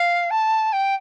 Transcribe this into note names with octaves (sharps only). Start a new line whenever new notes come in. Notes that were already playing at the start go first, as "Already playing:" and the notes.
Already playing: F5
A5
G5